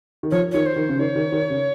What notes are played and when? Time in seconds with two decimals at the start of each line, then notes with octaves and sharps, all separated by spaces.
0.23 D#3
0.31 F3 C#5
0.52 D#3 C#5
0.66 C5
0.76 D#3
0.89 C#3
0.99 D#3 C#5
1.16 D#3
1.32 D#3
1.50 C#3